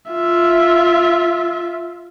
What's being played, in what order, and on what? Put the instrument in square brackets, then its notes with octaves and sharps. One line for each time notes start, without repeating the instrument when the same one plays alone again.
[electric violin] F4 E5